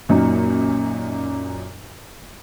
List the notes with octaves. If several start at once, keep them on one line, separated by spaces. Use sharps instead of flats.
F#2 A#2 F#3 A#3 D#4